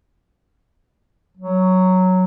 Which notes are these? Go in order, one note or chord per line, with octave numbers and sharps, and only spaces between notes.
F#3